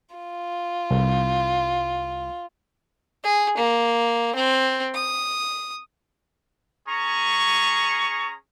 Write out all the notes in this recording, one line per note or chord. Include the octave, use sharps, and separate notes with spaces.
F4
C2
G#4
A#3
C4
D#6
C#4 G#4 A#5 C#6